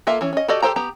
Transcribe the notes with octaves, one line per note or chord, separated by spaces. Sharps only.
A#3 F4 A4 E5
E3 C#4
C#4 D#5
F#4 G4 A4 D5 D#5
G4 A4 C5 G5 A#5
B3 G4 A#5